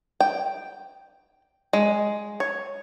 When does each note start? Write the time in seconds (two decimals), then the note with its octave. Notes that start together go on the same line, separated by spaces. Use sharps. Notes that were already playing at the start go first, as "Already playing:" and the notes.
0.20 G5
1.73 G#3
2.40 C#5